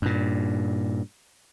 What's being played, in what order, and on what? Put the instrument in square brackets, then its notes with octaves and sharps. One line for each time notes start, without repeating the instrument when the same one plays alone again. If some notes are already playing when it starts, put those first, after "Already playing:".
[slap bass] G2 A#2